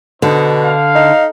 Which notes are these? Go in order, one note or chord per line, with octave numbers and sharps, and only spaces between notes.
B2 D3 D#4 C5
F5
D#4